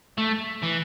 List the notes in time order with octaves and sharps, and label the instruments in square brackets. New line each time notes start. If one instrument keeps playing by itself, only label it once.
[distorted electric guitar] A3
E3